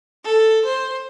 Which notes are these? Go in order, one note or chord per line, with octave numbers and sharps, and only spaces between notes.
A4
C5